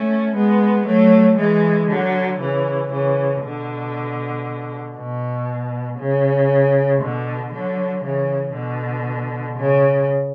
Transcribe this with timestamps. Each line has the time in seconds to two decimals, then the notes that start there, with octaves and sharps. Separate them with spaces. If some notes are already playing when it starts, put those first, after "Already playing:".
Already playing: A3 C#4
0.35 G#3 B3
0.86 F#3 A3
1.37 E3 G#3
1.89 D3 F#3
2.40 C#3 E3
2.92 C#3 E3
3.43 B2 D3
4.97 B2
5.99 C#3
7.01 B2 D3
7.53 D3 F#3
8.04 C#3 E3
8.55 B2 D3
9.57 C#3